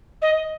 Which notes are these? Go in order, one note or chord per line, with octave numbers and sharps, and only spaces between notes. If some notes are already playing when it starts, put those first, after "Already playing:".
D#5